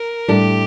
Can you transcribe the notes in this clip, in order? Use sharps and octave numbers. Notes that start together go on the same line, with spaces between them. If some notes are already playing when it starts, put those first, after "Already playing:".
Already playing: A#4
A2 G3 D4 G4 A4